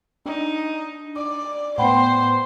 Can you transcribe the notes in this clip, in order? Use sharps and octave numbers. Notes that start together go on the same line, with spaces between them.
D4 D#4
D5 D6
A2 B3 C5 F#5 G5 B5